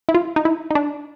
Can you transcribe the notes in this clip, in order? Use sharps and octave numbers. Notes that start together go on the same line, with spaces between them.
E4
F4
D#4
E4
D#4
D4